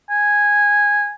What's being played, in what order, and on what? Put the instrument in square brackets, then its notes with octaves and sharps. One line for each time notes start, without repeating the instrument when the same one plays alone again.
[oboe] G#5